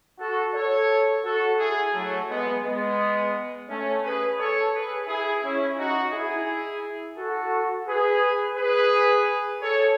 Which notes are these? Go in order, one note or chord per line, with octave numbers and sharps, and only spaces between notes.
F#4 A4
A4 C#5
F#4 A4
E4 G#4
F#3 A3
G#3 B3
G#3 B3
A3 C#4
G#4 B4
A4 C#5
G#4 B4
E4 G#4
C#4 E4
D#4 F#4
E4 G#4
F#4 A4
G#4 B4
G#4 B4
A4 C#5